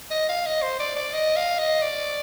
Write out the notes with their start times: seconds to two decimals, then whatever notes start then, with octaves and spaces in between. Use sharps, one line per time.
0.11 D#5
0.29 F5
0.46 D#5
0.62 C5
0.80 D5
0.96 D5
1.13 D#5
1.36 F5
1.59 D#5
1.82 D5